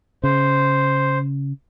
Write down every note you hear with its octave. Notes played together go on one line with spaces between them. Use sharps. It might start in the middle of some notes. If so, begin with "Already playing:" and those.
C#3 C5